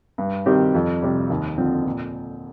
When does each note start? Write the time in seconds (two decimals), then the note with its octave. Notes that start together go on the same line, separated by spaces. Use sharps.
0.18 G2
0.46 D#3 G3 C4 G4
0.75 F2
1.02 C3 G3
1.30 D#2
1.58 D3 F3 C4
1.85 A#2